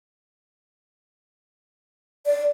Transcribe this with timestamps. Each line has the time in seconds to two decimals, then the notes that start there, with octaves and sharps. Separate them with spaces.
2.26 D5